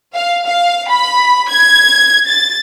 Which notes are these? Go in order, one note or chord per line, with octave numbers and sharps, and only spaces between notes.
F5
F5
B5
G#6
A6